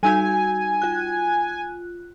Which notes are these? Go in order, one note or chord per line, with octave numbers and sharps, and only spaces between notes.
G3 D#4 F#4 G#5
F4 F#6